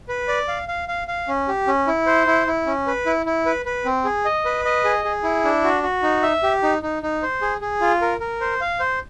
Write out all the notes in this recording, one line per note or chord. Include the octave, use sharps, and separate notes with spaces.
B4
D5
F5
F5
F5
F5
C#4
G4
C#4
E4
C5
E4
E4
C#4
B4
E4
E4
B4
B4
C4
G#4
D#5
B4
D#5
G#4
G#4
E4
D4
F#4
F#4
D#4
E5
G4
D#4
D#4
D#4
C5
G#4
G#4
F4
A#4
A#4
C5
F5
C5